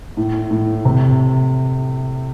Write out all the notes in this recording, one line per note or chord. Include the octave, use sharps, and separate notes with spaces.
A2
A2
C3